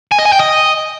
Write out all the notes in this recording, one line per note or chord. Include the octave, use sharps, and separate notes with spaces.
G#5
D#5
G#5
G5
D#5